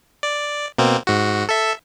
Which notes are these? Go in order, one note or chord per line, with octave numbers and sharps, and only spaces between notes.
D5
B2 A#3 C4
G#2 F#4
A4 E5